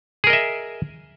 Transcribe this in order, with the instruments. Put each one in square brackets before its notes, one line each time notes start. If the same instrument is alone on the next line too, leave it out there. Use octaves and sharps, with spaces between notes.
[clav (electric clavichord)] G#4
A#4
D#5
E5